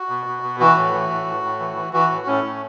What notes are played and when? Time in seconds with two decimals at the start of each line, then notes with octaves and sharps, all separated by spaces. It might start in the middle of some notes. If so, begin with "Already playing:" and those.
Already playing: F#4
0.09 B2
0.26 B2
0.43 B2
0.60 E3 F#4
0.76 A2
0.93 E3
1.10 A2
1.26 A2
1.43 A2
1.59 E3
1.76 E3
1.93 E3 F#4
2.10 A2
2.27 A2 C#4
2.44 A2